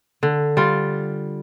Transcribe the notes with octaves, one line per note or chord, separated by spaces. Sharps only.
D3
G3 F4